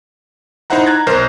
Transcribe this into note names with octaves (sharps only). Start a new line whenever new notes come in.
D#4 E4 C5 E5 F#5 A#5
A#5 F#6 G#6 A6
B1 A#4 C5